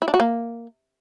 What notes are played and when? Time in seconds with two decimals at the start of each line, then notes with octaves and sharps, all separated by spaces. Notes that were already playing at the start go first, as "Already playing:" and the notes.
0.02 E4
0.08 D4
0.14 F#4
0.20 A#3